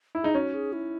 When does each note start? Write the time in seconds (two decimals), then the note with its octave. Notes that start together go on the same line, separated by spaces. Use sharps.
0.15 E4
0.23 D#4 G#4
0.35 C#4 F#4
0.54 G#4
0.73 E4